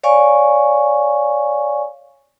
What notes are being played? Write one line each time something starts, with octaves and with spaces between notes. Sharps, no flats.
C#5 D5 F5 G#5 C#6